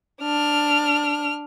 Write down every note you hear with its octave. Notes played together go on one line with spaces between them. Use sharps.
D4 F6